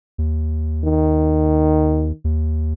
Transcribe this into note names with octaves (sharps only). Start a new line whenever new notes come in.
D#2
D#3
D#2